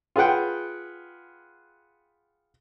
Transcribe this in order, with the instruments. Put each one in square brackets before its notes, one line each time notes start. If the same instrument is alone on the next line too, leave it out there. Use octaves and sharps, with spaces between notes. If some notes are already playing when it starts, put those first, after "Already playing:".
[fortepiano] F4 G#4 B4 F#5 G5